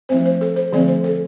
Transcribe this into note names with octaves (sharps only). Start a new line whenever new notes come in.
F3 A3 C4 C5
C5
A4
C5
D3 F3 A3 C4 D5
C5
A4